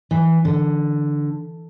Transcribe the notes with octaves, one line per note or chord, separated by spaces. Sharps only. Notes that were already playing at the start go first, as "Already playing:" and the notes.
E3
D3